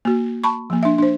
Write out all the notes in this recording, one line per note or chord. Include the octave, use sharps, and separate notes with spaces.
A#3 F#4
A5 B5 C#6
F3 A#3
D4 E5
D4 C5